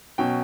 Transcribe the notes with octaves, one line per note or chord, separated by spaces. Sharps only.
B2 F#3 C#4 G5